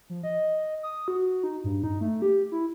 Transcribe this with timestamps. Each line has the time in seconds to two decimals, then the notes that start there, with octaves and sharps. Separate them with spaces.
0.10 F3
0.23 D#5
0.83 D#6
1.08 F#4
1.43 D#4
1.64 G2
1.84 D#4
2.01 A3
2.22 G4
2.51 E4